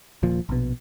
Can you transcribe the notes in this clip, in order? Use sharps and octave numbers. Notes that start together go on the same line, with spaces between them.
D#1 A#2 F3
A#1 B2